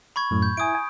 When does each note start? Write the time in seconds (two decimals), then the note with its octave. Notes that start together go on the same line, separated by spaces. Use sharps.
0.16 B5 C#6 G#6
0.31 F#2 A2
0.42 G6
0.57 E4 G#5 D#6 D7
0.75 G#5